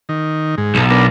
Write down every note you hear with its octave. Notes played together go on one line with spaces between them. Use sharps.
D#3
G#2
B1
B3 D4 A#4